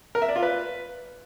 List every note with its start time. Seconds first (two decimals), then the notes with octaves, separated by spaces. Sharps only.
0.15 A#4
0.22 E5
0.29 D5
0.36 F4
0.43 B4